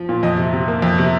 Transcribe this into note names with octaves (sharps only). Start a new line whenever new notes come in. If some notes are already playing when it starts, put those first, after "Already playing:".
Already playing: F3
A#2
F2 D#5
C3
C3
A#3
F2
C3